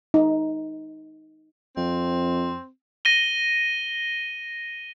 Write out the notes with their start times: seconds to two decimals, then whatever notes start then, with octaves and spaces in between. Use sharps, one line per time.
0.14 D#4
1.77 F2 C4
3.05 A#6 D#7 G7